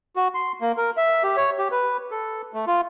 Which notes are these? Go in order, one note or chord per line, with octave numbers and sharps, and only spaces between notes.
F#4
C6
A#3
A#4
E5
G4
C#5
G4
B4
A4
A3
F4